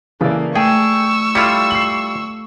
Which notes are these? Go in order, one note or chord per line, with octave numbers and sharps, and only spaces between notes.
C#3 E3 A#3 A4 D5
A3 G#4 G5 C#6 E6
G3 E4 F4 A4 F5 C#7
C7 F#7